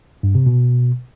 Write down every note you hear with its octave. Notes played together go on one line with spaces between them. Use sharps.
G2
C3
B2